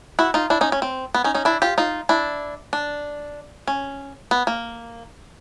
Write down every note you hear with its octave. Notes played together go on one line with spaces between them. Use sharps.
E4 F#4
D#4 F4
D4 E4
C#4 D#4
C#4
C4
B3
C#4 D#4
C#4 D#4
D4 E4
F4 G4
D#4 F4
D4 E4
D4
C#4
B3
A#3